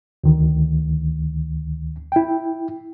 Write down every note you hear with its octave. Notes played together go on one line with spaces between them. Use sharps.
D2 D#3
E4 G5